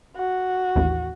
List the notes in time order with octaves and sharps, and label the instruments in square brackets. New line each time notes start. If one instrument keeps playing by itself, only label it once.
[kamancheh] F#4
[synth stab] A1 D#2